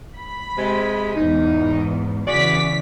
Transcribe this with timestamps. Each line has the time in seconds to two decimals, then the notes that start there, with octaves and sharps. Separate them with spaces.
0.17 B5
0.58 C3 G#3
1.15 E2 G#2 D#4
2.27 C#3 E3 F#4 G#4 D5 B6